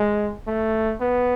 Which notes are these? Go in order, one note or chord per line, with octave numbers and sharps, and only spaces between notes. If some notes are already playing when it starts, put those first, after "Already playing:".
Already playing: G#3
A3
B3